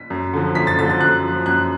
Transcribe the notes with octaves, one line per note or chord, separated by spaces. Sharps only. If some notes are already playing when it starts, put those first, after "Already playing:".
Already playing: B6
F#2
D3 F3
F#2 B6
A6
D3 F3 A6
A6
F#2 F#6
F3
F#2 F#6